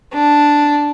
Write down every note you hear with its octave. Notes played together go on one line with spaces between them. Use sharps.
D4